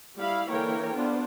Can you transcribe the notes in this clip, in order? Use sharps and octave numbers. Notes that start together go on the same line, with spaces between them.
G3 E4 F5 B5
D3 E3 A#3 A#4 C#5 G5
B3 D4 F4 C5